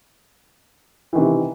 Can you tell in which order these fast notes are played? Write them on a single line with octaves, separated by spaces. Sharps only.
E3 D#3 C3